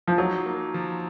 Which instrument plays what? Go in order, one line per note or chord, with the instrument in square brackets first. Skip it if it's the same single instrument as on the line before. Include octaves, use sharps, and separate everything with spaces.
[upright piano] F3
[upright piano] F#3 [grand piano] D#4
[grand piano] A#3
F3